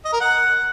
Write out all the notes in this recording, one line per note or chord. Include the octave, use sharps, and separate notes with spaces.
D#5
A#4
F#5